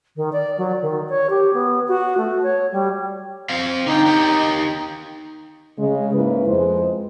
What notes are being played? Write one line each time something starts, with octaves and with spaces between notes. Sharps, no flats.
D#3
D5
F#3
D#3
C#5
G4
B3
F#4
A3
C#5
G3
C4 F5
D3 D#4 G5
D#3 G4
C#3 G#3
G#2 C#3 A#3 E4 B4
F2 G#3 C5